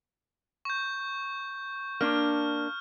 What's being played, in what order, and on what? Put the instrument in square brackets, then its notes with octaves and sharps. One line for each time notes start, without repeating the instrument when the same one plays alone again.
[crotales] C#6 G6
[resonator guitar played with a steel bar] A#3 D4 [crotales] F6